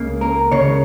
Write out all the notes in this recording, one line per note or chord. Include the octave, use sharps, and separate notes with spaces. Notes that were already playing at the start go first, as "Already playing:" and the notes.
Already playing: C#2 C#3 A#3
A#4
C#2 C#3 A#3 C#5